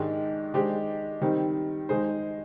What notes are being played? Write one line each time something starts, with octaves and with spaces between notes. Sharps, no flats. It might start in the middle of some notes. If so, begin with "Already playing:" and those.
Already playing: G#2 D#3 G#3 D4 G4
D#3 G#3 D4 G4 C5
D#3 G3 C4 D#4
D#3 G#3 D#4 G#4 C5